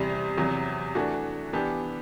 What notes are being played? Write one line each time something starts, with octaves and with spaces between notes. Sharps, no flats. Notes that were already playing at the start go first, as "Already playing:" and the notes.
Already playing: E2 C3 G3
E2 C3 F#3
E3 A3 D4 F#4
E3 B3 D4 G4